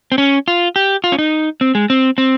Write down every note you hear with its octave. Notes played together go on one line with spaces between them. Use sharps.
C4
C#4
F4
G4
F4
C#4
D#4
C4
G#3
C4
C4